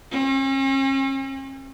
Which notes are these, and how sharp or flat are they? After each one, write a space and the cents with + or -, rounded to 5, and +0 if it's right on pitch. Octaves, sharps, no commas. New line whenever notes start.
C#4 -45